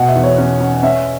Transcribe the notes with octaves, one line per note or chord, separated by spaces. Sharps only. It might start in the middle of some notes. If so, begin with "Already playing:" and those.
Already playing: B2 F#5
E5
E2
C#5
C#4
C#4
C#4 E5